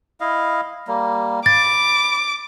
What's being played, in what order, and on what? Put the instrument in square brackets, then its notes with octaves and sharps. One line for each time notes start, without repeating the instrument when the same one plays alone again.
[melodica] E4 D#5 F5
G3 A#3
[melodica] B5 [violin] D6 [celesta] A6